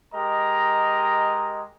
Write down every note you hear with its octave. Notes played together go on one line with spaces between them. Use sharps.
G#3 G4 A#4 D#5 A#5